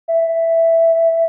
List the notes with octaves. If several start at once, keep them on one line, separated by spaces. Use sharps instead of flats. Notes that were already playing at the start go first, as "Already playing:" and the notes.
E5